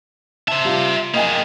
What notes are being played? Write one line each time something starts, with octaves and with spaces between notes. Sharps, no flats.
C5 E5 A5
G3 F4
A#3 G#4 D#5 G5 G#5